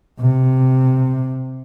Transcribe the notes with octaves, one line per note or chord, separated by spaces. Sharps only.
C3